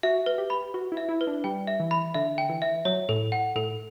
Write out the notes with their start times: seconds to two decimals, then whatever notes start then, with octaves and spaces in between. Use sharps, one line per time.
0.03 F#4 E5
0.26 B4
0.38 G4
0.50 B5
0.74 F#4 B4
0.92 E4
0.97 E5
1.09 E4
1.21 B4
1.27 D4
1.44 G3 G5
1.67 E5
1.80 E3
1.91 B5
2.14 D3 E5
2.38 G5
2.49 E3
2.62 E5
2.85 F#3 C#5
3.09 A2 A4
3.32 F#5
3.55 A2 A4